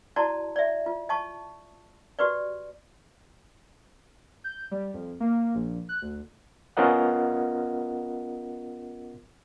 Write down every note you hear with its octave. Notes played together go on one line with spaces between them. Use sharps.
E4 F#4 D5 A5 A#5
D5 E5
F4
D#5 A5 C#6
F#4 G4 B4 D5
G6
G3
F2
A#3
A#1
F#6
D2
B3 C#4 F4 A#4 D#5 F#5